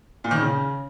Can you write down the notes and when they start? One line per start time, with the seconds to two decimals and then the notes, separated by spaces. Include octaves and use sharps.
0.24 A#2
0.31 D#3
0.38 C#3